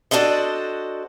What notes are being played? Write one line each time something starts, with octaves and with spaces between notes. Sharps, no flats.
D4 F#4 A4 C5 D#5